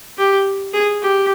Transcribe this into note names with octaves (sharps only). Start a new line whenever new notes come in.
G4
G#4
G4